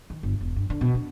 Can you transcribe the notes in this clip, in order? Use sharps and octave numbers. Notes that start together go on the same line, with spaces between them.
D#3
G1
E1
G2
D3
B2
D4